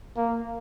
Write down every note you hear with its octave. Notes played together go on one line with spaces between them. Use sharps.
A#3